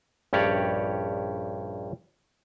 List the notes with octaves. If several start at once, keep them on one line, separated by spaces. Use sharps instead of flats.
A#1 G2 C#4 G4 C#5 D5